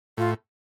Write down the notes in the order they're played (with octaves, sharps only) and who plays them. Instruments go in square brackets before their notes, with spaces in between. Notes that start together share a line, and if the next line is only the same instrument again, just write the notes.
[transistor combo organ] A2 [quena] F4